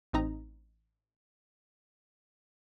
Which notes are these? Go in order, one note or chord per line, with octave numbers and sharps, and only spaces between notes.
A1 C4 D#4 A#5